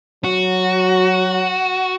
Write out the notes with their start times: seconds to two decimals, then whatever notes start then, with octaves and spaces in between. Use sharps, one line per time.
0.24 F#3 F#4